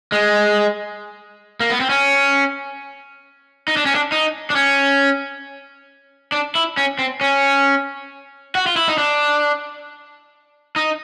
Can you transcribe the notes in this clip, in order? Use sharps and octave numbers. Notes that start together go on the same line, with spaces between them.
G#3
A#3
B3
C4
C#4
D#4
D4
C#4
D4
D#4
D4
C#4
D4
E4
C#4
C4
C#4
F#4
F4
E4
D#4
D4
D#4